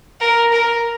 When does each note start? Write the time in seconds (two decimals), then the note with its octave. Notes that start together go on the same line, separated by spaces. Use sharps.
0.20 A#4
0.52 A#4